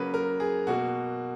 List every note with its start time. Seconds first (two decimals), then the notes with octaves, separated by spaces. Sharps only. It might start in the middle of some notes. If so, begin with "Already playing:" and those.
Already playing: C#3 F#3 A#3 B4
0.14 A#4
0.40 G#4
0.67 B2 A#3 F#4